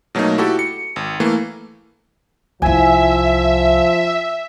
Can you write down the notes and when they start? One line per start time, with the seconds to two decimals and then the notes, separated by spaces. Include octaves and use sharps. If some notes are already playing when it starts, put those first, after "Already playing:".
0.15 B2 F#3 A3 A#3 D#4
0.38 E4 F#4 G4 A4
0.59 C#7
0.96 G#1
1.20 E3 A3 A#3
2.62 C2 F3 E4 E5 G#5